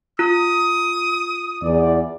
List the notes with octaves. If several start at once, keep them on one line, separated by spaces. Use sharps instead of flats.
F4 D#6
E2 D5